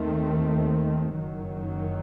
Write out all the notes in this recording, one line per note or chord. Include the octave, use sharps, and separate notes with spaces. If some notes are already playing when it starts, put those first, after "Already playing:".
Already playing: D#2 D#3 A3 C4
F#1 F#2 D#3 F#3